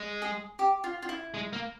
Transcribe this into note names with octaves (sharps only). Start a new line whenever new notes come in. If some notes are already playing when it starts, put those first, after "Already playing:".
Already playing: G#3
G#4
G4
F4
F4
E4
G#3
A#3